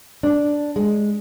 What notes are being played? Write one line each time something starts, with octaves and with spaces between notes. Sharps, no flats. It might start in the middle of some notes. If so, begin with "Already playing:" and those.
D4
G#3